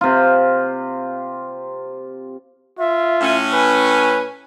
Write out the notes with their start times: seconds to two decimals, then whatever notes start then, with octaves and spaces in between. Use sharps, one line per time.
0.01 C3 F4
2.78 F4 E5
3.21 A2 C#4
3.53 B4 G#5